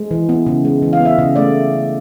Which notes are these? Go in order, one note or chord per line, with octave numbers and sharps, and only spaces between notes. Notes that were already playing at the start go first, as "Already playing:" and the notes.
Already playing: G#3
E3
B3
C#3
G#3
E3
F5
B3 E5
C#3 D#5
A3 D5